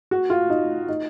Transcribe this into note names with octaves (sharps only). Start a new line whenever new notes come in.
F#4
F4
D#4
D#4